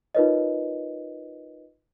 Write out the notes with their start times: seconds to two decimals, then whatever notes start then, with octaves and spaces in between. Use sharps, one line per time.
0.15 D#4 F4 A#4 B4 C#5 D#5